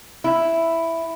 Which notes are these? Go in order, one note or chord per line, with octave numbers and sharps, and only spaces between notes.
E4